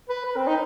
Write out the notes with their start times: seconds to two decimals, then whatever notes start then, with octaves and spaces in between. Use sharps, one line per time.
0.09 B4
0.26 B4
0.36 C4
0.47 D#4